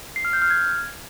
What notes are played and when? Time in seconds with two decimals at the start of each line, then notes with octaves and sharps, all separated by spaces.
0.16 C7
0.25 F6
0.33 G6
0.42 F6
0.50 G#6